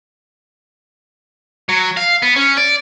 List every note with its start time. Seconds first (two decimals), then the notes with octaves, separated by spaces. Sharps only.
1.69 F#3
1.97 F5
2.22 B3
2.36 C#4
2.57 D5